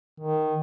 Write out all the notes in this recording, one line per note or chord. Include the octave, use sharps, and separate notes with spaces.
D#3